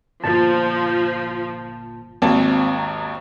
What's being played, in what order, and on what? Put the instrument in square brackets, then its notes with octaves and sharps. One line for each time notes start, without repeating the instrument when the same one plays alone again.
[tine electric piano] G1 A#2 A5 [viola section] F3
[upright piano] G#1 D#2 A5 [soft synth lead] C4
[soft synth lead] A#5